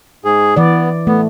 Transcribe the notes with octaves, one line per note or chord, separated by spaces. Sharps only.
G#2 G#4
E3 B3 D5
A3 B3